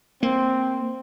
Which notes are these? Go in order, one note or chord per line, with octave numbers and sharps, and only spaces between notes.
A#3 C4